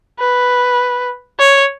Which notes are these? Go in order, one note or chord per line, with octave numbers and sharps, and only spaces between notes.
B4
C#5